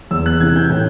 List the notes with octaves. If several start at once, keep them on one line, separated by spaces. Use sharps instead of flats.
E2 E6
F#6
C3 E3 G#6
G6
A2 G6